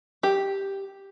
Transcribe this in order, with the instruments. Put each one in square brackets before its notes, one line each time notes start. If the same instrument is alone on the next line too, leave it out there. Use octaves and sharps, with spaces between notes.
[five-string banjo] G4